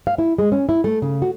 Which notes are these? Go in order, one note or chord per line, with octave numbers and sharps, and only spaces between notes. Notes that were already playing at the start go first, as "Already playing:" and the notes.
F5
E4
G#3
C#4
E4
A3
C#3
F#4